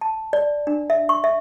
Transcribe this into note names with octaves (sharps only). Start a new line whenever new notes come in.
A5
D5
D4
E5
C#6
E5